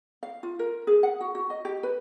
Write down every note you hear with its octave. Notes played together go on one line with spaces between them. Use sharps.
F5
F4
A#4
G#4
F#5
F#4
F#4
D#5
G4
B4